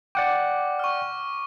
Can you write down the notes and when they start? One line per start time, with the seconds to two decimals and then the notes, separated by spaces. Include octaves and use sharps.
0.15 D5 F#5 G5 D6
0.79 C#6 F6